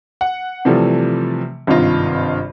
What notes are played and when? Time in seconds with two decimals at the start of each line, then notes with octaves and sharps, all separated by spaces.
0.21 F#5
0.65 C3 E3 F3 G3 A3
1.67 G#1 G2 C3 D#4 F4 D#5